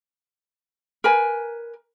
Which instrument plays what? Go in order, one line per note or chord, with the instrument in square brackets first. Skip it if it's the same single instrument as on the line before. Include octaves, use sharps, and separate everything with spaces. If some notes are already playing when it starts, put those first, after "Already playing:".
[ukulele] A#4 B4 G#5